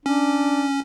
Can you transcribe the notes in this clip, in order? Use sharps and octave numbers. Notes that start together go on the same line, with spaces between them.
C#4 D4